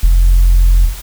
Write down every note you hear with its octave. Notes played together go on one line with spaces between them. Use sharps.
F1